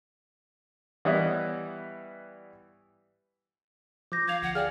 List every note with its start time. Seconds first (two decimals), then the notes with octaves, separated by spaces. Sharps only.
1.05 E3 G3 B3 E4 C#5 D#5
4.12 F3 D6 G6 A#6
4.28 F5 G#6 F7
4.43 D2 F#5
4.55 G#4 D5 F5 G5 F6